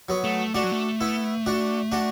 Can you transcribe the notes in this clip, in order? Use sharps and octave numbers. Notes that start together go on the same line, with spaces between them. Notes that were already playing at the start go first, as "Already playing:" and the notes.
F#3 B3
A3
A3 D4 F#4
F#3
A3
B3 E4
D4 F#4
D4 F#4